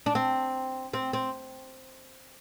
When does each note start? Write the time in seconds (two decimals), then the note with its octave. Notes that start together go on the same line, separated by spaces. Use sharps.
0.06 D4
0.15 C4
0.94 C4
1.13 C4